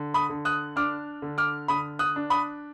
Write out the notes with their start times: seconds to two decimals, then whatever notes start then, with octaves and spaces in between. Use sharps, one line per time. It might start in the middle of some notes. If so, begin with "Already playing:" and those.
Already playing: D3
0.14 B5 D#6
0.29 D3
0.45 D#6 F#6
0.76 D4 D6 F6
1.22 D3
1.38 D6 F6
1.68 D3 B5 D#6
1.99 D#6 F#6
2.16 D4
2.30 B5 D#6